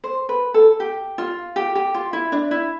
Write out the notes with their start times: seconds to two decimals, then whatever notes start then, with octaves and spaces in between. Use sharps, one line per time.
0.04 C5
0.29 B4
0.54 A4
0.80 G4
1.18 F4
1.56 G4
1.75 G4
1.94 F4
2.13 E4
2.32 D4
2.51 E4